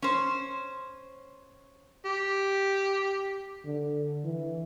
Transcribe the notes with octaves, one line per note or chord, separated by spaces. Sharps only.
C#4 C5
G4
D3
E3